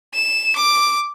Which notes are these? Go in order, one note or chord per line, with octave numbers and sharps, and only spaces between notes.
E7
D6